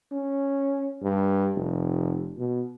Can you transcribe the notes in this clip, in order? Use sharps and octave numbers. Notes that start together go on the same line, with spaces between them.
C#4
G2
F1
B2